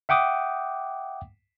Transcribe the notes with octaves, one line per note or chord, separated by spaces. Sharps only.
E5 F#5 G5 D6 D#6